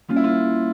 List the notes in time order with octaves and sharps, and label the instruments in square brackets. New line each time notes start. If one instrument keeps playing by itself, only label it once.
[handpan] G3 A#3 C#4 [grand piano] F4
[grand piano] E4
F4